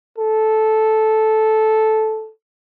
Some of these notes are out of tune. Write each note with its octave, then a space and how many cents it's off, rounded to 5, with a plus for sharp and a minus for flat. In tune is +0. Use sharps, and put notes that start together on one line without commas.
A4 -10